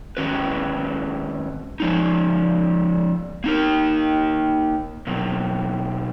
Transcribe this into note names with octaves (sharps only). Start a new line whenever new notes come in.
D#3 G#3 C#4 F#4 B4
F3 G#3 D#4
A#3 D#4 A#4
B2 F#3 A#3